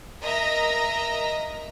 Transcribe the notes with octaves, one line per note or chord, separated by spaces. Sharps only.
A#4 D#5 E5 A#5